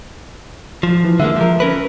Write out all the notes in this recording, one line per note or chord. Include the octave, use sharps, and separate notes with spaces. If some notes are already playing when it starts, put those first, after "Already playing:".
F3
E3
D3 G#3 A#3 E5
F3 A#4
C#4 A#4 B4